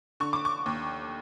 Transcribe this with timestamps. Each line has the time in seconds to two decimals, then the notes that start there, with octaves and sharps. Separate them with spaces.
0.20 D3 C#6
0.33 D6
0.45 C#6
0.66 D#2